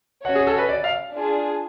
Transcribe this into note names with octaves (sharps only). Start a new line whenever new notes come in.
C#4 F#4 C#5 F#5
G#4
A4
B4
D5
F5
D4 F4 G#4